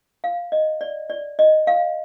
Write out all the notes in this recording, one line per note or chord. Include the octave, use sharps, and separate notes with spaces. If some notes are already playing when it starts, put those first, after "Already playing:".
F5
D#5
D5
D5
D#5
F5